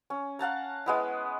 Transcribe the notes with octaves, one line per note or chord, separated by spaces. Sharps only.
C#4
F5 F#5 A5 A#5
G#3 B3 E4